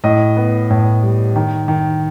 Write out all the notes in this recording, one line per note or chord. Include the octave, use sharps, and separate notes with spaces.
A2 D#5
B3
A2
G3
D#3
D#3